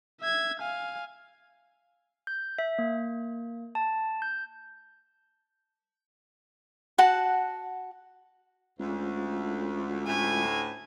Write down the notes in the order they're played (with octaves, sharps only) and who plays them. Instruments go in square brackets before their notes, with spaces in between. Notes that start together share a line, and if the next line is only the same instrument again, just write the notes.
[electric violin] E5 G#6
F5 G#5
[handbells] G6
E5
A#3
A5
G6
[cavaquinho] F#4 F#5 A5
[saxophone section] D2 [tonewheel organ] G#3 C#4 F4
[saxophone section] D2 A2 [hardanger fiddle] G#5